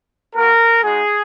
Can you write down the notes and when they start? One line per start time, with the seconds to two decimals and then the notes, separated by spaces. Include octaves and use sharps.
0.34 A#3 F#4 A#4
0.83 G#3 D#4 F#4 G#4